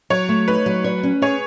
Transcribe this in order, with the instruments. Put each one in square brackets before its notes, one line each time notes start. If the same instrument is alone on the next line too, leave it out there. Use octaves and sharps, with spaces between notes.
[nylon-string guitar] F#3 [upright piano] C#5
[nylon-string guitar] A3
[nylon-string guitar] D#4 [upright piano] B4
[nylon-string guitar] F#3
C#5
C#4
[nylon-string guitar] G#4 [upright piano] C#5